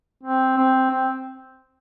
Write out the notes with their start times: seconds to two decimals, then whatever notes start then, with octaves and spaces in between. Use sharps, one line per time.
0.23 C4
0.57 C4
0.91 C4